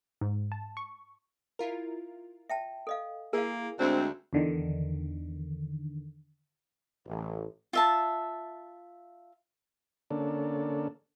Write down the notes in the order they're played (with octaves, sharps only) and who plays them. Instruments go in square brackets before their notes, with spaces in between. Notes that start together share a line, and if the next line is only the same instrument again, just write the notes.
[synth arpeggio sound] G#2
A5
C#6
[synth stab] E4 F4 A#4
[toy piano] E5 G5 A5
A4 D#5 F5
[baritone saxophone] A#3 [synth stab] E4 G#4 [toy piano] A#4 F5
[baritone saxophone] D2 [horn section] G#3 C4 [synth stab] D4
[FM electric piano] E2 D3 D#3
[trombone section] A1
[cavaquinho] F4 E5 A5
[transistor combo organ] D3 A#3 C#4 D4 A4